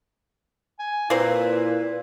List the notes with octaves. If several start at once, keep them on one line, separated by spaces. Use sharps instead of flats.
G#5
A#2 A#3 C4 E4 B4